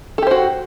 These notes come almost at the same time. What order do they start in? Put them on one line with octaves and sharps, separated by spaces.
A4 G4 C5 F#4